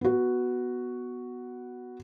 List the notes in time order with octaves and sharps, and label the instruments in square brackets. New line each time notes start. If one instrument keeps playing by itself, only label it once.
[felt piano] B3 F#4